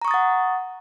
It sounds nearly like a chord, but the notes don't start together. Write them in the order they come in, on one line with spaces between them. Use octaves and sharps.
A#5 C#6 D#6 A6 F#5